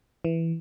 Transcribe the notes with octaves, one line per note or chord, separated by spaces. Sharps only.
E3